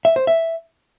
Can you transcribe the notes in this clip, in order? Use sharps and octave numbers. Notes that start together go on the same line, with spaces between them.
E5
C5
E5